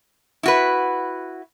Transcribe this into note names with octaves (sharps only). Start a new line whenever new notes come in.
E4 F#4 B4